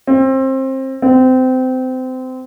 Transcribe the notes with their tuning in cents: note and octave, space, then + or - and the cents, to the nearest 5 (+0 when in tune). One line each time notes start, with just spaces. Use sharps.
C4 +25
C4 -25